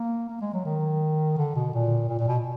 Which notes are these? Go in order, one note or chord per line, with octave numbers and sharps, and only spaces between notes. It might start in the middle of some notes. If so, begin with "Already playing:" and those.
Already playing: A#3
A#3
G#3
F#3
D#3
D3
B2
A#2
A#2
A#2
B2